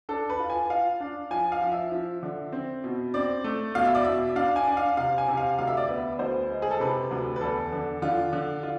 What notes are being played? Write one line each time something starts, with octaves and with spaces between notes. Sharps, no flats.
D4 A4
B4
F4
G#5
F4 F5
D4
F3 G#5
F5
F3
E5
F3
D3
C4
B2
C4 D5
A3
B2 F5
E5
D5
B2 E5
D4 F5
G#5
D4
F5
C3 F5
G#5
C3
F5
D2 F5
E5
D5
B3 E5
D2 C5
G#3
G#4
A4
C3 B4
D2
B4
E2 A4
D3
D3 F4
D3
F4